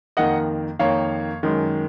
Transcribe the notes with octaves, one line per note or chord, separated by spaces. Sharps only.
F2 D#3 A#3 D#5 F#5
F2 D#3 A#3 C#5 F5
F#2 D#3 G#3